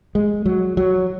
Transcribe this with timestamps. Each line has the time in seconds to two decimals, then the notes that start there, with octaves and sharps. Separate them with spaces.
0.15 G#3
0.46 F#3
0.77 F#3